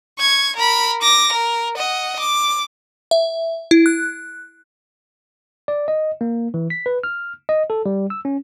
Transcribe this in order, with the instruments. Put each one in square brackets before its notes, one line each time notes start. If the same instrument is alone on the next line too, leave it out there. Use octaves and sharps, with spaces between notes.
[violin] C#6 G#6
A#4 B5
D6 A#6
A#4
D#5 F#5
D6
[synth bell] E5
E4
F#6
[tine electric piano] D5
D#5
A#3
E3
B6
B4
F6
D#5
A4
G3
E6
C#4